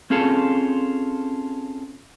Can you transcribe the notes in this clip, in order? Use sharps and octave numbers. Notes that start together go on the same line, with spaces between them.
C4 C#4 F4 G#4 A4